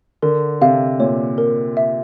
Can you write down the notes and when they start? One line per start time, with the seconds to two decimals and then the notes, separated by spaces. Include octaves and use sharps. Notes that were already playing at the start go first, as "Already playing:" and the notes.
0.23 D3 A#4
0.61 C3 F5
0.99 A#2 C#5
1.38 A#4
1.77 E5